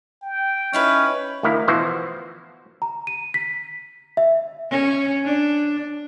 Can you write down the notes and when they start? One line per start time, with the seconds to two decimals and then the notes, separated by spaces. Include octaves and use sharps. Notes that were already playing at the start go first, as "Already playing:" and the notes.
0.23 G5
0.73 C#4 D#4 E4 B4
1.43 D2 D#3 E4 A#4 F5
1.68 B2 E3 F3 F#4 C5
2.82 A#5
3.07 D#7
3.34 B6
4.17 E5
4.70 C#4
5.25 D4